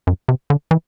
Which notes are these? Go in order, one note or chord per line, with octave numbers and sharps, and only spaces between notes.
F#2
C3
D3
E3